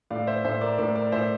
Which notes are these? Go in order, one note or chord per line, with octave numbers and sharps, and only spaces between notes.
A2 D5 F5
C5 E5
A2 C5 E5
A#4 D5
A2 A#4 D5
A#4 D5
A2 C5 E5